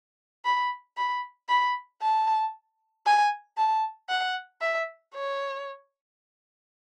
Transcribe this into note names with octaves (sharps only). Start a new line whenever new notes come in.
B5
B5
B5
A5
G#5
A5
F#5
E5
C#5